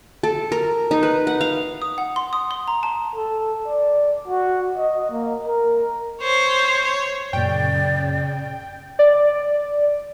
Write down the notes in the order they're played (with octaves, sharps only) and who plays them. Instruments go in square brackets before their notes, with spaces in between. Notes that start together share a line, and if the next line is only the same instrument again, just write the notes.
[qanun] A4
A#4
D#4
B4
F#5
F5
[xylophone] D#6
F#5
C6
D#6
C6
A#5
A5
[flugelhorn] A4
D5
F#4
D#5
A#3
A#4
[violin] C5 C#5
C#5
[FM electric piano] F#2 A#2 [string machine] C#3 [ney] D5 [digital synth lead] G5
[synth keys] D5